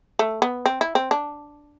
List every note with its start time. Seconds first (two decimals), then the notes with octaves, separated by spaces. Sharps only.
0.19 A3
0.42 B3
0.66 C4
0.81 E4
0.95 C4
1.11 D4